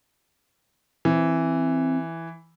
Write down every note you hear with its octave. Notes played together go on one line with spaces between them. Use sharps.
E3 C4